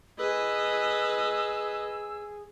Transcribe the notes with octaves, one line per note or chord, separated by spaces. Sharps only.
G#4 B4 D#5 E6